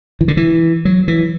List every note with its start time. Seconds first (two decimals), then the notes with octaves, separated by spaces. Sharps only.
0.21 E3
0.28 D3
0.37 E3
0.85 F#3
1.08 E3